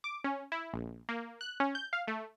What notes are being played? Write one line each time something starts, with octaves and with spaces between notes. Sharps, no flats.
D6
C#4
E4
A#1
A#3
F#6
C#4
G6
F5
A3